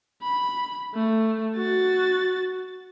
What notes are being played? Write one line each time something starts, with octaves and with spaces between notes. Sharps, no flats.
B5
A3
F#4 A6